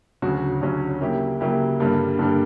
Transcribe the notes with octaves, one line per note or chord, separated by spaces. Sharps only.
D2 C#3 F#3 C#4 F#4
D2 C#3 F#3 C#4 F#4
C#3 F#3 A#3 E4 G4
C#3 F#3 A#3 E4 G4
G2 D3 G3 A#3
G2 D3 G3 A#3